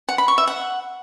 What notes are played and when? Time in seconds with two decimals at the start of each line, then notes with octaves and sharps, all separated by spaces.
0.09 F#5
0.18 B5
0.28 C#6
0.38 E5
0.48 F#5